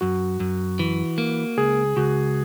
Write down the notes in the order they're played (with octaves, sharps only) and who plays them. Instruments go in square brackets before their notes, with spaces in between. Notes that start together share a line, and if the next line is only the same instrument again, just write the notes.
[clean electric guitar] F#2 [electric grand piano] F#4
[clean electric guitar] F#2
E3
A#3
[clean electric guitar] C#2 [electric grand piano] G#4
[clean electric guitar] C#2 [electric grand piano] F#4